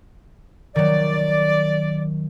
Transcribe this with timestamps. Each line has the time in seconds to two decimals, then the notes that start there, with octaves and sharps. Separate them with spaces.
0.76 D#3 F#3 D5